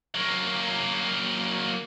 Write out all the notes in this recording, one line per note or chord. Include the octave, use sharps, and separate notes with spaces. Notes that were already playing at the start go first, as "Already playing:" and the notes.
F#3 A#3